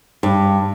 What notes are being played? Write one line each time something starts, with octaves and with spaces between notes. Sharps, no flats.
G2